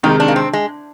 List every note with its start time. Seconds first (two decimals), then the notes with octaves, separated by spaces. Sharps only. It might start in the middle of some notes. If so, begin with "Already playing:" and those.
0.03 C3 D#3 G#3 D#4
0.20 D4
0.28 A#3
0.36 C4
0.53 G#3